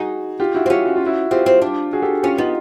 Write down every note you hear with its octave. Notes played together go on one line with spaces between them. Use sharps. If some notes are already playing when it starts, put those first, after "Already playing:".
Already playing: D#4 F#4 G#4
F4 G4
E4 F#4
C4
C#4 F4 G4
F#4
F4
E4 F#4
C4 F4 G4
C4
D4
F#4 G#4
G4 A4
C#4 F4 G4
B3 D#4 F4